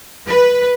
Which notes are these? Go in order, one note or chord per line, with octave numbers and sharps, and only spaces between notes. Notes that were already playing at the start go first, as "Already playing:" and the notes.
B4